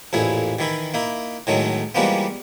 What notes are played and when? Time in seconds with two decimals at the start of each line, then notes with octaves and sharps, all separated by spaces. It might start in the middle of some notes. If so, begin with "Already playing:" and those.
0.13 A1 F2 A#2 E4 G#4
0.59 D#3 E3 E4
0.94 A#3 D#4 E4
1.47 A2 D#3 F#3 G#3 A3
1.95 E3 F3 G3 G#3 A#3 B3